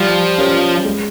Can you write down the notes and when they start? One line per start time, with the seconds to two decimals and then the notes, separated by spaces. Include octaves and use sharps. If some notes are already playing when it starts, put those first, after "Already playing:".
Already playing: F3 G3
0.38 C#4 G4 A#4
0.85 G#3